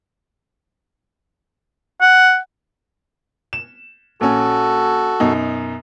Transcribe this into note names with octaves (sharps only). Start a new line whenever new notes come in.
F#5
E7
A#1 C#4 F#4 A4
F#2 B2 D#4